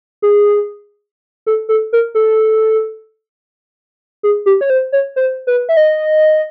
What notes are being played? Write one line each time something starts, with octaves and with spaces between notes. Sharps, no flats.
G#4
A4
A4
A#4
A4
G#4
G4
C#5
C5
C#5
C5
B4
E5
D#5